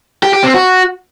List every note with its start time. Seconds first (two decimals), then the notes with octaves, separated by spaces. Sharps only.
0.23 G4
0.33 G4
0.44 C4
0.54 F#4